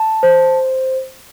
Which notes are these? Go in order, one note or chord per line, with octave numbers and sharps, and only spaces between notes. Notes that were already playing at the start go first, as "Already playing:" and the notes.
Already playing: A5
C5